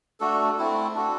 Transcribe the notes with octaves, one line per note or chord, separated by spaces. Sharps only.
A3 D4 F#4 A4
A3 C4 E4
D4 F#4 A4